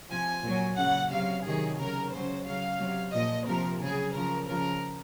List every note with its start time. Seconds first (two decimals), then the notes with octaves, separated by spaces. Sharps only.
0.11 C3 F3 G#5
0.44 A#2 F#3
0.78 C#3 F#3 F#5
1.12 C3 F#3 F5
1.45 C3 D#3 F#3 G#4
1.79 C#3 F#3 A#4
2.13 C#3 F#3 C5
2.46 C#3 F#3 F5
2.80 C3 F#3
3.14 A#2 F3 D#5
3.47 C3 F3 A#4
3.82 C#3 F#3 G#4
4.14 C#3 F3 A#4
4.48 C#3 F3 A#4